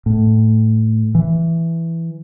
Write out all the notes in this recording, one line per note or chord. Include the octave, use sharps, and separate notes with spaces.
A2
E3